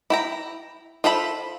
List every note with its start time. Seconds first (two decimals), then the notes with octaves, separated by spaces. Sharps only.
0.10 E4 G5 A#5
1.04 F4 A4 C5 E5 B5